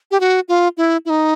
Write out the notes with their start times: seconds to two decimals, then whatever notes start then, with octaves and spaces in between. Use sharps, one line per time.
0.11 G4
0.20 F#4
0.48 F4
0.77 E4
1.05 E4
1.10 D#4